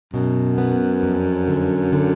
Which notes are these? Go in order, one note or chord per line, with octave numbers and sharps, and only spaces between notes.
F#2 B2
B3
F2
D3
D3